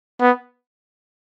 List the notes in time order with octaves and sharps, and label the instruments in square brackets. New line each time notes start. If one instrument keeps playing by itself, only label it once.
[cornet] B3